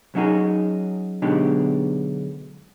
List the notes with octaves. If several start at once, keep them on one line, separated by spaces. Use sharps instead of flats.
F#3 C#4 D#4 F#4 G#4
B2 D3 F#3 G#3 D#4 G4